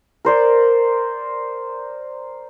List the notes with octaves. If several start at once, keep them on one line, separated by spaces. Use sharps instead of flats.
A#4 C5 D5